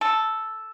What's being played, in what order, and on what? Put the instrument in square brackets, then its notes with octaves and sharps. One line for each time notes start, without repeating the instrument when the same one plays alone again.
[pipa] A4